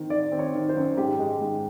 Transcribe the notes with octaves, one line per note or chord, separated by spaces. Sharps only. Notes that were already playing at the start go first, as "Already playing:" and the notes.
Already playing: D#3 C4
D#3 D5
C4
C#5
D#3
C5
F#2
G#2 G4
G#3
G#2